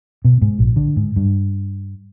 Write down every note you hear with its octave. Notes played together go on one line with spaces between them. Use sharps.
B2
G#2
A#1
D3
G#2
G2